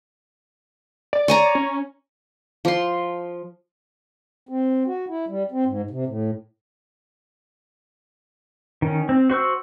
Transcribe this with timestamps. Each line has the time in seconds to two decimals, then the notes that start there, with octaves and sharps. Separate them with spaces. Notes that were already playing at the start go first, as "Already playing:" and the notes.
1.13 D5
1.28 C#5 G#5 A#5
1.55 C#4
2.65 F3 C6
4.49 C4
4.87 F#4
5.09 E4
5.28 G3
5.51 C4
5.67 G#2
5.91 C3
6.06 A2
8.82 D#3 C#4
9.09 C4
9.30 F#4 C5 C#6 E6